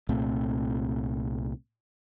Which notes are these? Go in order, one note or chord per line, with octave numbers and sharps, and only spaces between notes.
C2 A#2 A3 C4